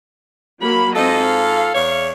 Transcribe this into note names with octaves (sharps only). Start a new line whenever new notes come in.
F#3 A#3 B5
G#2 C4 F4 A4 D#5
F5
E2 C#5